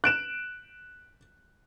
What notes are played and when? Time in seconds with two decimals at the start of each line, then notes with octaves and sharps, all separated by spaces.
0.04 F#6 D7 E7